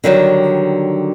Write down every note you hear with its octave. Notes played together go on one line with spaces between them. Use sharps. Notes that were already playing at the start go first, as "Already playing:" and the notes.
D3 D#3 F#3 G3